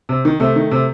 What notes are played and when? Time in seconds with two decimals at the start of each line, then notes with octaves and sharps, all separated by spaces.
0.09 C3
0.25 D#3
0.40 C3 A3
0.56 D#3
0.71 C3